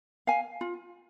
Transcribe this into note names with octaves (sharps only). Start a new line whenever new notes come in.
F5 G#5
F4